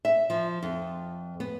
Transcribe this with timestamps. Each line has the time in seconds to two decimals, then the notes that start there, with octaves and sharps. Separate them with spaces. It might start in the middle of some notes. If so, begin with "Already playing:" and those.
0.05 E5
0.30 F3
0.63 F2
1.40 B3